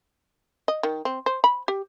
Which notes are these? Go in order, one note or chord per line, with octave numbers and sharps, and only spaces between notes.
D#5
D#3
C4
C5
B5
G4